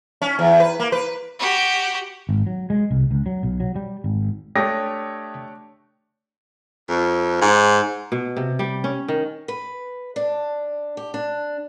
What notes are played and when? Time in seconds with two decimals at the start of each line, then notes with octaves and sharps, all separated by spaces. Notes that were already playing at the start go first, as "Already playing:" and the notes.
0.22 C#4
0.39 E2
0.60 B4
0.80 A#3
0.92 B4
1.39 F#4 G4
2.29 G#1
2.47 F#3
2.70 G#3
2.91 C2
3.11 C#2
3.26 F#3
3.43 B1
3.60 F#3
3.76 G3
4.04 G#1
4.56 A3 D4 G4 C#5 G5 D#6 A#6
6.89 F2
7.41 G#2
8.12 B2
8.37 C3
8.59 G3
8.84 C#4
9.08 D#3
9.48 B4
10.16 D4
10.97 G4
11.14 D4